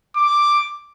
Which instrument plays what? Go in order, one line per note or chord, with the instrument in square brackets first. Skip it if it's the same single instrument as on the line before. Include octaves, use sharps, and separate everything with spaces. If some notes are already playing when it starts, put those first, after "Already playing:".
[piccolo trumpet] D6